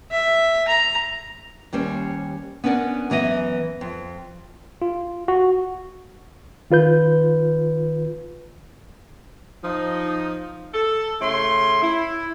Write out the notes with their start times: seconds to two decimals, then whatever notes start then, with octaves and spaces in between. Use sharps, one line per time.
0.12 E5
0.68 A#5
1.73 D#2 G3 C#4 C5
2.64 B3 C#4 D4 A#4 D5 F#5
3.10 F#2 E3 B3 D#5
3.81 F2
4.82 F4
5.28 F#4
6.71 D#3 F4 B4 G6
9.63 F3 D#4
10.74 A4
11.21 C#3 A3 C#4 E4 C6
11.82 E4